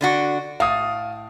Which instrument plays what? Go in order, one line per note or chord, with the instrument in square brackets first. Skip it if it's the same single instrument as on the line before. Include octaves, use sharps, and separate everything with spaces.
[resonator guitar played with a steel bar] D3 D4 F#4
[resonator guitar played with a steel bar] A2 [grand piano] F5 D#6